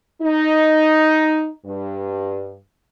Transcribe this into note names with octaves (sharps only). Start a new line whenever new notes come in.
D#4
G2